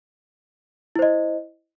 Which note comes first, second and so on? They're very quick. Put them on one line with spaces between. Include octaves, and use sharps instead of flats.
E4 C5 D#5